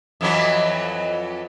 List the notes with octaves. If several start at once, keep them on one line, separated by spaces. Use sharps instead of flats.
F2 E3 F#3